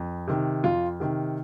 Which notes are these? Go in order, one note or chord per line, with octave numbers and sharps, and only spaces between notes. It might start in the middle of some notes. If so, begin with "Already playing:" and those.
Already playing: F2
C3 D#3
F2 F4
C3 D#3